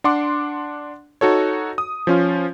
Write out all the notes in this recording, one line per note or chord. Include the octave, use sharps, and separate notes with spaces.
D4 F#5 C6 D6
D#4 F#4 A4 C#5
D#6
F3 C#4 F4